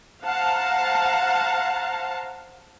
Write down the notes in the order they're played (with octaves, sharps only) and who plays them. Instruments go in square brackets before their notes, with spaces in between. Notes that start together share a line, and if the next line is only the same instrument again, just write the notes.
[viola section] C5 F5 F#5 A5 A#5